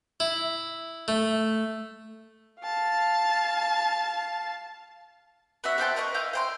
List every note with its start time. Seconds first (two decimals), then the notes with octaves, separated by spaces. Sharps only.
0.20 E4
1.08 A3
2.62 F5 A5
5.64 B3 F#4 E5
5.78 B3 C5 G5 A5
5.96 A#4 B4 D#5 C#6
6.14 E4 D#5 F5 G6
6.33 C5 G5 C6